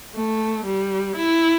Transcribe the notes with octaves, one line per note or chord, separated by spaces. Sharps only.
A3
G3
E4